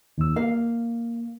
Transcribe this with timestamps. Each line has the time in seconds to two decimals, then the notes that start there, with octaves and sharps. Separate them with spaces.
0.18 D#2 E6
0.36 A#3 F5